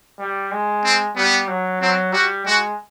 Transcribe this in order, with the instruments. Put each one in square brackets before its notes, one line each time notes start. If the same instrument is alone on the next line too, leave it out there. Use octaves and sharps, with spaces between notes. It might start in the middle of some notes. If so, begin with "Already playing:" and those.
[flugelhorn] G3
G#3
[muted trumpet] C4
[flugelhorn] G3 [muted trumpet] B3
[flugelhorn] F#3
[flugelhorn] F#3 [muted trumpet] C4
[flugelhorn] G3 [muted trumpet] F#4
[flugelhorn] G#3 [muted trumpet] F#4